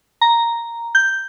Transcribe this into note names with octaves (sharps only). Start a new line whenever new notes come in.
A#5
G6